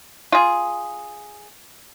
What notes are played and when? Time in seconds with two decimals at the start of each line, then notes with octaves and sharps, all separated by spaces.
0.32 F4 G#4